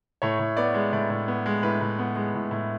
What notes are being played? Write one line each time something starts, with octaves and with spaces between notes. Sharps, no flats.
A2 C#5
A2
B3 D5
G#3
A2 D5
A2
B3
G#3
A2 B4
A2
B3
G#3
A2
A2